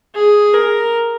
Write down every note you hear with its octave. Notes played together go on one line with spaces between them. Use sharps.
G#4
A#4